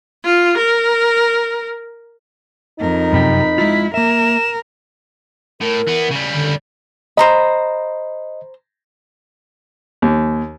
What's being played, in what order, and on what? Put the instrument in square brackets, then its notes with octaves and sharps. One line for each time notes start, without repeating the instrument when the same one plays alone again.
[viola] F4
A#4
[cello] F2 A#4 [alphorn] D#4
[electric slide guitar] F#2 C3 G4 [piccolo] B5
[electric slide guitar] G#3 F4 [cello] E4
[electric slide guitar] A#3 E5 [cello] A#4 [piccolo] E7
[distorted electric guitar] A2 [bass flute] A#4
[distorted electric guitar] E3 B3
C#3 G3
[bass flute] D3
[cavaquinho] C5 A#5 B5 [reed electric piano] D#5
[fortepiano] D#2